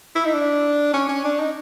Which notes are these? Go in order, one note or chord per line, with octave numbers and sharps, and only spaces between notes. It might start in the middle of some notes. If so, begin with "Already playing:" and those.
E4
D#4
D4
C#4
C#4
D4
D#4